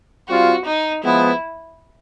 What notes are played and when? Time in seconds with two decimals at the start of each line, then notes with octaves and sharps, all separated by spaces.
0.28 G3 C4 F4 F#4
0.66 D#4
1.03 F3 G#3 B3 E4